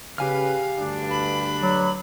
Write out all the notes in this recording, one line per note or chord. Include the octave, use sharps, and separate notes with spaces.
C#3 G4 B4 F5 G#5 F6
D2 G2 D4
B5
F#3